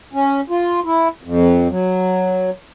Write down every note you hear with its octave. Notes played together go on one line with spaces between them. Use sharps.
C#4
F4
E4
F2
F#3